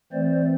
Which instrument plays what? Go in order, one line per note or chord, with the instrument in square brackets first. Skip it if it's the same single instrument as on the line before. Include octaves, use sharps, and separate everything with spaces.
[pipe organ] E3 A3 C4 C5 D5